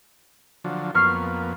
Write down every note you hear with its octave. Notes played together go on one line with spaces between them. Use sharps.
D3 F3 F#3
F2 A#3 B3 C#6 F6 C7